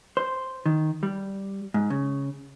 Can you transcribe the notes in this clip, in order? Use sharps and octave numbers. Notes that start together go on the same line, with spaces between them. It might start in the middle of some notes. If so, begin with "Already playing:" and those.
C5
D#3
G3
G#2
C#3